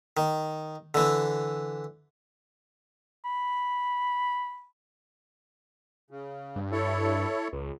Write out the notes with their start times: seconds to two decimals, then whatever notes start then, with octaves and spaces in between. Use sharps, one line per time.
0.17 D#3
0.94 D3 E3
3.25 B5
6.11 C#3
6.56 G2
6.72 E4 A4 C#5
7.53 C#2